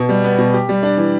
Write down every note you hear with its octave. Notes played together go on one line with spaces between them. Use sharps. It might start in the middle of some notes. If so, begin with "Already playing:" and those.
Already playing: B2
G3
B3
B2
G4
G3
D4
E3